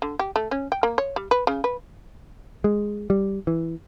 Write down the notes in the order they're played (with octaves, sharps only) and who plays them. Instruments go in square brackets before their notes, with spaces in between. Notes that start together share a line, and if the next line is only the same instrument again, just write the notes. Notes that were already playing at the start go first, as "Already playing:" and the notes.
[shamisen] D3
G4
A3
C#4
G5
A#3
C#5
G3
B4
C#3
B4
[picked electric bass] G#3
G3
E3